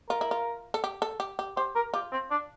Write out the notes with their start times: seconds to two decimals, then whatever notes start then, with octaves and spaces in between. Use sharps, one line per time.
0.09 F4 A#4
0.21 E4
0.31 F4
0.74 A4
0.84 G4
1.02 A4
1.20 G4
1.39 G4
1.57 G4 C5
1.75 A#4
1.94 F4 G4
2.11 C4
2.30 D4